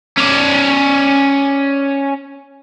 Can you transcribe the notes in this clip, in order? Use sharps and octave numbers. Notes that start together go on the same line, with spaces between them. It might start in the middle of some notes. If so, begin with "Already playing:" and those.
C#4 D5